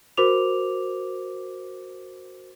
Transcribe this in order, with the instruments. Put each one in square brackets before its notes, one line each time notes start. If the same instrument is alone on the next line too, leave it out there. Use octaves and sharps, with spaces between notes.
[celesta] F#4 A#4 C5 D6 F7